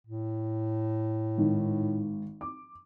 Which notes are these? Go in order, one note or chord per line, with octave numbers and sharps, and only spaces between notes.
A2
G#1 D#3
D6